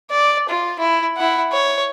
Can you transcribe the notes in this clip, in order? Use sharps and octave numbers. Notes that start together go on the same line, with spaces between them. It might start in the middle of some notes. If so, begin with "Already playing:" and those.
D5
F4
E4
E4 F#5
C#5